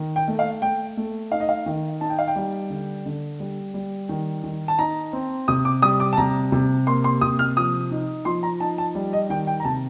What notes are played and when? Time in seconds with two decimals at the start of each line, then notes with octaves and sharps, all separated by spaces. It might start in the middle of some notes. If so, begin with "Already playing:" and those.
Already playing: D#3
0.16 G5
0.28 A3
0.39 F5
0.62 A3 G5
0.97 A3
1.31 D#4 F5
1.40 D#5
1.49 F5
1.66 D#3
2.01 D#4 A5
2.10 G5
2.19 F5
2.28 G5
2.36 G3
2.70 D3
3.06 D3
3.40 G3
3.74 G3
4.09 D#3
4.44 D#3
4.68 A5
4.79 D#4 A#5
5.13 C4
5.48 C3 D#6
5.65 D6
5.82 G3 D#6
6.00 D6
6.13 A5
6.17 C3 A#5
6.52 C3
6.87 A#3 C6
7.04 C6
7.21 C3 D#6
7.39 F6
7.57 F3 D#6
7.91 D#4
8.25 F3 C6
8.43 A#5
8.60 D#4 A5
8.78 A5
8.95 G3
9.13 D#5
9.30 D#3 G5
9.47 G5
9.60 A#5
9.65 C3 A5